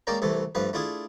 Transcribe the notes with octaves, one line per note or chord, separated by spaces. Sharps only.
G#3 A#3 C#4 D5 G5 A#5
C2 C3 E3 A3 A4
G2 F3 A3 B4
A3 D4 E4 F4 G#4